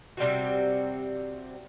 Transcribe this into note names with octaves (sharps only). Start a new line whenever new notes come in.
C3 G3 C4 F#4